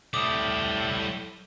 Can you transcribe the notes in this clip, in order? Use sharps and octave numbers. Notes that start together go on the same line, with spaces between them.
A2 G3 E4 D6 D#6